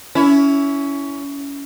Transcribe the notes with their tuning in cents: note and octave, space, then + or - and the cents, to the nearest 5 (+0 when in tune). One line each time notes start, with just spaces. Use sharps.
C#4 +20 E4 +0